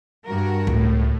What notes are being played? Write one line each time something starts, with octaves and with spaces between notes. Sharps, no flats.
G2 F#4 A#4
C#2 A2